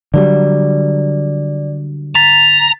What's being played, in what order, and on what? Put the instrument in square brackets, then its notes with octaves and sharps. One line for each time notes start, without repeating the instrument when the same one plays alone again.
[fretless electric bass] D3 F#3 G3 [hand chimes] D5
[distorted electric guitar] A#5 [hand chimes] A6 B6